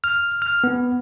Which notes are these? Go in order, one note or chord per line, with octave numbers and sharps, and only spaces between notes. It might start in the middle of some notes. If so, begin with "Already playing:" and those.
F6
F6
B3